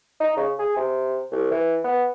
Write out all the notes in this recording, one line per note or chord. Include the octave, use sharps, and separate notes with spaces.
D#4
C#3
G#4
C3
C2
E3
B3